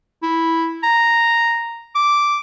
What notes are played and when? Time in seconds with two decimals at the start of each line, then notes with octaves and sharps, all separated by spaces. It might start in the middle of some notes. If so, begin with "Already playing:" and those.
0.23 E4
0.83 A#5
1.95 D6